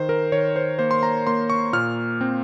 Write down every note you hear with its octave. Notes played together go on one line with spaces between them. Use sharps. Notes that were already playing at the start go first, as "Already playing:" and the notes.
Already playing: D#3 C5
A#4
D#3 C#5
C5
A#3 C5
C6
A#5
A#3 C6
C#6
A#2 F6
C4